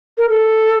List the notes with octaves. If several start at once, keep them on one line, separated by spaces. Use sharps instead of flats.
A#4
A4